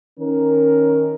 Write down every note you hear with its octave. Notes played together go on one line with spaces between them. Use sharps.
D#3 C#4 A#4